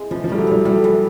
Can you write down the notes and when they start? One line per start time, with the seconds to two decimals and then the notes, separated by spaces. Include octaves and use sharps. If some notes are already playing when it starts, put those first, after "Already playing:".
Already playing: G#3 C4 E4
0.11 E3 F3
0.24 F3
0.29 G3 A3
0.38 F#3
0.47 E3 G3
0.65 G3 A3
0.84 E3